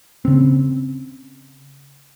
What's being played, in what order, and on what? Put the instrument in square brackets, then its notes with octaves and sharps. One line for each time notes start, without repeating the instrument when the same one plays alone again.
[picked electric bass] C#3 C4